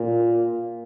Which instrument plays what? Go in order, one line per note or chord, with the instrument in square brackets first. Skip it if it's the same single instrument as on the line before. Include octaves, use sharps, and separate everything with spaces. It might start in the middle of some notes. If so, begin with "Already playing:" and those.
Already playing: [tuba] A#2